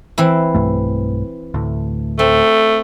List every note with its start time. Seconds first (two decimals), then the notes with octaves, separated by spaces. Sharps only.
0.18 E3 C4 E4
0.55 B1 G2 A3
1.54 D2 A2
2.19 A3 C4